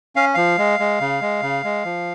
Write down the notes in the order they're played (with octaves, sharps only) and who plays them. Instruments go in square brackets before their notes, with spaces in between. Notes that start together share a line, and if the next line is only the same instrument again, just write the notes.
[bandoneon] C#4 F5
F3 F5
G#3
G#3
C#3
G#3
C#3
G#3
F3